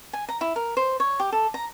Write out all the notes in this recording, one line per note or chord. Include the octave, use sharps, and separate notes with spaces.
G#5
A#5
E4
A#4
C5
C#5
G4
A4
A#5